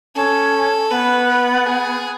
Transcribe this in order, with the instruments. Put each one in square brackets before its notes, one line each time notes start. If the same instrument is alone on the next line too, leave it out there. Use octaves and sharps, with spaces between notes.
[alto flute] C#4 [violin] A4
[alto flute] B3 [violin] B4
[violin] B4
G#4